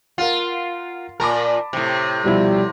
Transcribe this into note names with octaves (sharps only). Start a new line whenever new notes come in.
F4 A#4 F5 F#5
A#2 A#4 A5 B5 D6
A2 C3
B2 F3 G3 E4